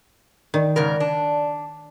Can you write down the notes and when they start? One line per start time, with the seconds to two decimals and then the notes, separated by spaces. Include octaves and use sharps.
0.54 D#3 D5
0.76 G#2 C#3 A#4
1.00 D4